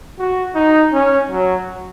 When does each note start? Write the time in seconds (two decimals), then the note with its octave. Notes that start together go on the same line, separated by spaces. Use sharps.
0.19 F#4
0.55 D#4
0.93 C#4
1.30 F#3